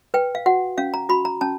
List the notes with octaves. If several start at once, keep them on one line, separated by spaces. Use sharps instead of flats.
B4 G5
F5
F#4 F#5
C#4 F5
A#5
F#4 B5
A#5
C#4 A5